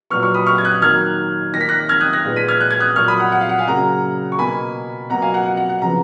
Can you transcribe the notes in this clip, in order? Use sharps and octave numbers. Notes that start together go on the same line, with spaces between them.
A#2 F#3 B3 C#6 F6
C#6 F6
B5 D#6
C#6 F6
G#6
D#6 F#6
D#3 F#3 A#3 F6 G#6
D#3 A#3 A#6 B6
F#6 A#6
F6 G#6
D#6 F#6
F#6 A#6
A#2 G#3 B3
B6 D#7
F6 G#6
F#6
G#6
D#6 F#6
A#2 F#3 A#3 C#6 F6
B5 D#6
F#5
F#5
F5
F#5
F5 G#5
C#3 F#3 A#3 F#5 A#5
C#6
B2 A#3 G#5 B5
B2 F#3 A#3 F#5 A#5
F5 G#5
F#5
F#5
F#5
F#5
C#3 F3 B3 A#5